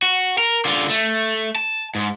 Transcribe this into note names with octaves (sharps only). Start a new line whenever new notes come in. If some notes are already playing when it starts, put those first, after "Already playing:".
F#4
A#4
D3 F4
A3
A5
G#2